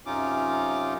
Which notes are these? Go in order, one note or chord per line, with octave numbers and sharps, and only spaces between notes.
F#2 C3 C#4 D#4 F4 D6